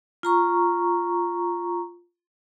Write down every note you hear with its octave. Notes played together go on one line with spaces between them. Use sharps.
F4 A#5 C#6